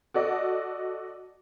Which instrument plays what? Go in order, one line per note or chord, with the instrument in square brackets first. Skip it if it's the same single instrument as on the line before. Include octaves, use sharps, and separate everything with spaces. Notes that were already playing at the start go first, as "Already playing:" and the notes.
[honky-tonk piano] F#4 A4 D5 D#5